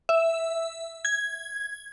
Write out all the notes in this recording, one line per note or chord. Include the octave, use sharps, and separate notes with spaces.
E5
G#6